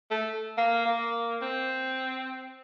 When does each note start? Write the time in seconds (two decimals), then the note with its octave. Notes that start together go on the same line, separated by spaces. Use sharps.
0.11 A3
0.58 A#3
0.86 A#3
1.42 C4